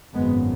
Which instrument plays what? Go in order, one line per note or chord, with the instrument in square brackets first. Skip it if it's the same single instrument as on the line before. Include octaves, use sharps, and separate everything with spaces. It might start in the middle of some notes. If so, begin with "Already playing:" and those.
[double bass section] G#1 F#2 C#3 G#3 B3